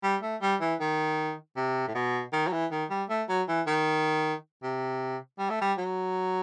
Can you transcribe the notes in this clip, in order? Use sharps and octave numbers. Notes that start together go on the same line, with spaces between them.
G3
A3
G3
E3
D#3
C3
A2
B2
D#3
F#3
E3
D#3
G3
A3
F#3
E3
D#3
C3
G3
A3
G3
F#3